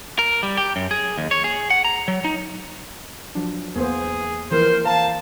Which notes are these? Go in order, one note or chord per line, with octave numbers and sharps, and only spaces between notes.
A#4
G3
G4
F#2
G#4
D#2
C#5
G#4
F#5
A#5
F#3
D#4
F3 F#3 D4
E2 A#3 B3 G#4 C5
E3 F3 A#3 C4 A#4 C5
F5 A5 A#5